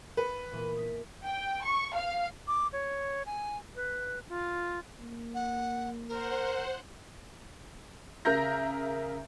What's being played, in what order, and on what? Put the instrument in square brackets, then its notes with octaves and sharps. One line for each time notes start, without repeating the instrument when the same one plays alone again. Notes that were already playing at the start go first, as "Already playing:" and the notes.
[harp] B3 C#5 [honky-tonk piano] B4
[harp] A#2 E3
D#6 B6
[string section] G5
C#6
F5
[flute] D6
C#5
G#5
B4
F4
[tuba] A#3
[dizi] F#5
[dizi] A#4 [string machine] C5 F#5
[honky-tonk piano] C#3 A#4 E5 A#5 G6 A#6